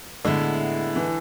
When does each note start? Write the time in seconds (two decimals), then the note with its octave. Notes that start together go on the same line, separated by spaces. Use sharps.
0.24 A2 D3 G#3 B3 E4
0.96 E3